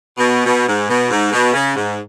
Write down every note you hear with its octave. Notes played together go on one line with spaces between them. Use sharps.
B2
B2
G#2
B2
G#2
B2
C#3
G#2